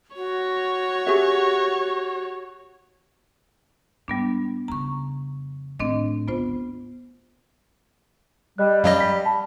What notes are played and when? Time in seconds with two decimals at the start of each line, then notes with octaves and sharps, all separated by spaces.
0.16 F#4 C#5
1.07 G4 G#4 E5
4.08 G#2 G3 B3 D4
4.68 F2 C#3 A#5 C#6
5.80 A2 D#3 C4 D4 D#5
6.28 G#1 D2 B3 F4 C5
8.58 G3 D#5 F#6
8.84 F#2 F#3 D#5 F5
9.00 B6
9.25 A5 B5